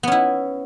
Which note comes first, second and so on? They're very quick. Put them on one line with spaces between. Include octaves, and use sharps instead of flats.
B3 C#4 E4